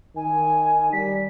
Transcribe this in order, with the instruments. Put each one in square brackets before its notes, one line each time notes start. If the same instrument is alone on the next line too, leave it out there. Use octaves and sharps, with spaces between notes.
[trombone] D#3 [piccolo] G#5
[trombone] G3 [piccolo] B6